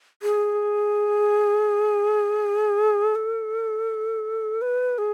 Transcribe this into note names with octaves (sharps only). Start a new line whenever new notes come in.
G#4
A4
B4
G#4